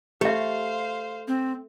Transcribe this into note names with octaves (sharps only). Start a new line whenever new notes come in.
A3 G4 C5 E5 F5
C4